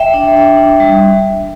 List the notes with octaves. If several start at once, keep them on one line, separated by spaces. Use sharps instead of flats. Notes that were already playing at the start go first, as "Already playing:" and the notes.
Already playing: E5 G5
D4
D4
D4
G3